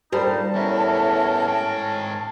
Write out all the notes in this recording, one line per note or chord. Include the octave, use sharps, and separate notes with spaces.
D2 A#2 G3 D#4 C5 A5
A2 B3 C#4 A#4 E5
G#2 G5